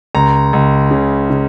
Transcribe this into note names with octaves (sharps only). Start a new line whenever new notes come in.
C#2 A#5
C#2
C#3
C#3